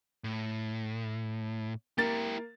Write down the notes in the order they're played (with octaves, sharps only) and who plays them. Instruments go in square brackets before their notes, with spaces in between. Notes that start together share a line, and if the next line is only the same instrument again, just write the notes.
[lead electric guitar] A2
[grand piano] A#3 A#4 A6 [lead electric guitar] E4 G4